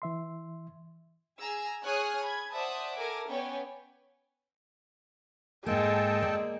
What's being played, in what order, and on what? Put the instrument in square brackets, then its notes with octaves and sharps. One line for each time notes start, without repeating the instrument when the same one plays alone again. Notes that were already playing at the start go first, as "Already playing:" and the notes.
[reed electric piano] E3 E5 C6
[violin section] G#4 G#5 A#5 E6
G#4 C#5 G#5 D#6 F6 F#6
B5 G#6
C5 D5 E5 F#5 A5 D#6
A4 A#4 G#5 D6
B3 C#4 C#5 D5 G5 G#5
[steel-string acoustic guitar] G#2 A#3 [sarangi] G#3 [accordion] A4 G5 A5
[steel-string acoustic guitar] A#3 D5